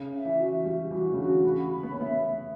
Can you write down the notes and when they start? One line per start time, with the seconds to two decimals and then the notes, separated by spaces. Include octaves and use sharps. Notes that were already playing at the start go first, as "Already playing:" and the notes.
Already playing: C#3
0.12 E5
0.25 E3
0.39 F#4
0.65 G3 F#4
0.91 E3 F#4
1.12 C#3
1.17 D3 F#4
1.43 C#3 B5
1.70 B5
1.83 B3
1.92 C#4
1.96 B3 E5